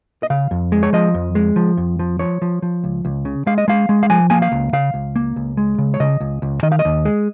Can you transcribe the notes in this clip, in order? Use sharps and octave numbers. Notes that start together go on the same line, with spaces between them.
D#5
C#3 F5
F2
G#3
C#5
F3 D#5
F2
G#3
F3
F2
F3
F3 C#5
F3
F3
C#2
C#2
C#3
G#3 F5
D#5
G#3 F5
G#3
F5
F3 G#5
A#3 G#5
F5
C#2
C#3 F5
C#2
A#3
C#2
G#3
C#3
C#5
C#3 D#5
C#2
C#2
D#3 D#5
F5
D#5
D#2
G#3